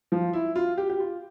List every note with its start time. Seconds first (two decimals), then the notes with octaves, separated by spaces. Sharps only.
0.12 F3
0.33 E4
0.56 F4
0.78 G4
0.90 G4
1.00 F4